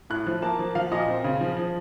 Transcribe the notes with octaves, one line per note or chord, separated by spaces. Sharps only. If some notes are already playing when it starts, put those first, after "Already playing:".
A2 F#6
F3
A#3 A5
F3
F3 F5
A#2 D#5
C4
C#3
F3
F3